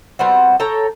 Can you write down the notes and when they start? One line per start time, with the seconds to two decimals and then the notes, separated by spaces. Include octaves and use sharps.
0.19 G3 B3 C4 F#4
0.60 A4 C#5 G5 A#5